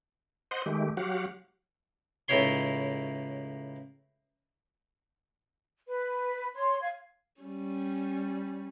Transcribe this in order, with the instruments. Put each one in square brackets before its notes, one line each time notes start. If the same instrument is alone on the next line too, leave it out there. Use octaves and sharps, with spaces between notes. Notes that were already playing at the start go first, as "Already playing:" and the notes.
[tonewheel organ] C5 D#5 F#5 C6
D#3 G#3 A3 G4
F#3 F#4 G4 F5 F#5
[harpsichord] C#2 A2 D#4 E4 C#5 C6
[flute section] B4
C#5 C6
F5 G#6
[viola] G3 C#4